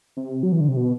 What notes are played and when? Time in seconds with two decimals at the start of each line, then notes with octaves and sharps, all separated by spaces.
0.17 C3
0.43 F#3
0.52 E3
0.60 D3
0.68 C3
0.77 B2